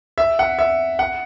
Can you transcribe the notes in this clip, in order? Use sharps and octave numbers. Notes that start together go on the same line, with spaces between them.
E5
F#5
E5
F#5